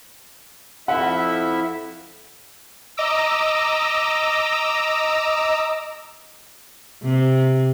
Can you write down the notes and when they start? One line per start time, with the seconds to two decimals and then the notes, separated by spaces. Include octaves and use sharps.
0.88 F2 E4 E5 F#5
2.97 D#5 A#5 D6 E6
7.03 C3